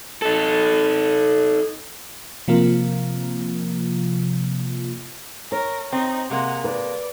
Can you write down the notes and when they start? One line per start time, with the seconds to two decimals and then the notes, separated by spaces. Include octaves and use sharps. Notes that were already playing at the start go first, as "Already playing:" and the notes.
0.22 D#4 A4
2.48 C3 F3 A#3 F4
5.52 A#4 C#5
5.93 C4 D#4
6.30 C3 G#3 A#3 F#5
6.64 B4 D5